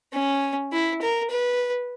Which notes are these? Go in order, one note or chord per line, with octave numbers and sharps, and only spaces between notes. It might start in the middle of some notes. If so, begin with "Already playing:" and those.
C#4
E4
A#4
B4